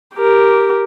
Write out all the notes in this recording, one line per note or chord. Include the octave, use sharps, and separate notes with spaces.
G4 A#4